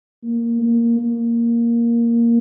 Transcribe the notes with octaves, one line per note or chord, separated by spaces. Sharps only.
A#3
A#3
A#3